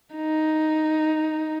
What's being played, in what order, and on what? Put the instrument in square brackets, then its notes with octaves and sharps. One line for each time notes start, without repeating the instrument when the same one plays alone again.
[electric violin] D#4